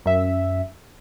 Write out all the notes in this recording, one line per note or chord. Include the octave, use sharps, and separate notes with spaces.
F#2 E5